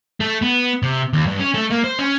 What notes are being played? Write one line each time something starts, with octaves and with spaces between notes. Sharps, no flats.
A3
B3
C3
D#2
G2
C#4
A3
A#3
C5
C#4